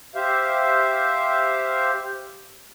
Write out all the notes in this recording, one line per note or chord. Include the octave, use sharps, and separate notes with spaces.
G4 C5 E5 F5